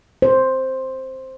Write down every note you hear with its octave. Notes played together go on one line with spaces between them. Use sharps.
C5